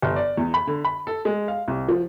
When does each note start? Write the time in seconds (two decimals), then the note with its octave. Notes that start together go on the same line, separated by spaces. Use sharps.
0.02 G1
0.16 D5
0.37 E2
0.54 B5
0.67 D3
0.85 B5
1.07 A4
1.25 G#3
1.48 F5
1.68 C2
1.88 F3